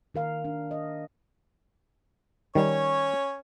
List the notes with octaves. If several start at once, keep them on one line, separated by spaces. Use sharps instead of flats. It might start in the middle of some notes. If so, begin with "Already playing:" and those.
D#3 A#4 F5
D4
D#5
D#3 G3 C#4 C#5